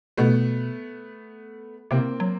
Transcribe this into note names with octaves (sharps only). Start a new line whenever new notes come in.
B2 A3 B3
C3 A#3 C4
F#3